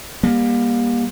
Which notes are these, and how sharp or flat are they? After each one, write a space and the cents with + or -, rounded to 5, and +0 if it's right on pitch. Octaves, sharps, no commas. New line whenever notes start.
G3 +35 A#3 +30